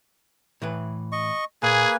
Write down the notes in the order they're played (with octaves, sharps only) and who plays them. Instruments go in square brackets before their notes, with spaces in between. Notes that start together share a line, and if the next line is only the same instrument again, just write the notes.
[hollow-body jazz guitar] A2 E3 B4
[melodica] D#5 C#6
[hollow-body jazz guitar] A#2 [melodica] A#3 B4 G#5 [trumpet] G#4